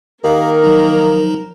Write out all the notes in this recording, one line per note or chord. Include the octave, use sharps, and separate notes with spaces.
D#3 A#3 G4 A#4 F5
F3 F#3 D#4